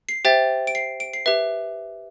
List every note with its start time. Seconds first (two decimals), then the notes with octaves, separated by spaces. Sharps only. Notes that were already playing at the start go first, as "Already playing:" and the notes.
0.09 C7
0.25 G4 C5 E5 G5 A6
0.67 D7
0.75 C7
1.00 D7
1.13 C7
1.26 G4 B4 E5